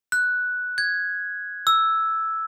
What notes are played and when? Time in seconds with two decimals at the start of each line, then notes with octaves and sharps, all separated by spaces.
0.12 F#6
0.78 G#6
1.67 E6